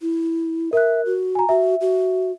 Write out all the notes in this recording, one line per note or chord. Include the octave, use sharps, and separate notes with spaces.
E4
A#4 E5 F#6
F#4
G#5 A#5
F#4 E5
F#4